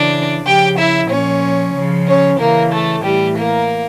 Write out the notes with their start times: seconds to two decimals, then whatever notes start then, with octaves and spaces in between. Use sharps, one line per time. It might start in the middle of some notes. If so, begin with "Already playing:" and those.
Already playing: C#3 E3 D4 D5
0.45 C#3 F3 G4 G5
0.78 E4 E5
1.10 A#2 F3 C#4 C#5
1.75 C#3 F3
2.07 C#4 C#5
2.39 C#3 E3 A#3 A#4
2.72 A3 A4
3.04 A2 E3 G3 G4
3.37 A#3 A#4